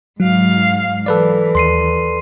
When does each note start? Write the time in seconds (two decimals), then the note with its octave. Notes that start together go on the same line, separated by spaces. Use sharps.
0.20 G#2 F#3 F5
1.06 E3 A4 B4 D5
1.55 D#2 C6 C7 D#7